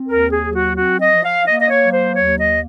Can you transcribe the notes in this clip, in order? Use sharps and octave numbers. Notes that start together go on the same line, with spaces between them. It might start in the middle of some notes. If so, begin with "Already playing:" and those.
Already playing: C4
D#2 A#4
G#4
F#3
F#4
C4 F#4
D#5
F3
F5
A#3 D#5
D#5
C#5
F#3
C5
D#2 C#5
D#5
A#3